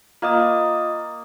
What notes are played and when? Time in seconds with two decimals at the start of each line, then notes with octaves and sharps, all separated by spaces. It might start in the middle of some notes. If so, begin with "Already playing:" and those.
0.22 A#3 F4 D#5 D#6